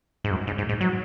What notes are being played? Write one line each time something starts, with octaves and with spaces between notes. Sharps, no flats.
G#2
F#2
G#2
G#2
G#2
F#3